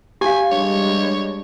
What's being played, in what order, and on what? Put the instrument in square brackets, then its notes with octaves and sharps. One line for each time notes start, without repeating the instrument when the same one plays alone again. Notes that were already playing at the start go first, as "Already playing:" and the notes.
[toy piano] G4 F5 [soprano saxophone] G#5
[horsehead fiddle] G3 G#3 [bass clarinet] D4 [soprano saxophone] C#5